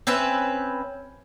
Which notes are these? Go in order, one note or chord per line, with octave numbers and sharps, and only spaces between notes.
C4 C#4 B4 E5